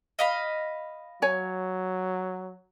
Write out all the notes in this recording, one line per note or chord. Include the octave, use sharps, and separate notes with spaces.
D#5 F5 B5
F#3 C#5 G#5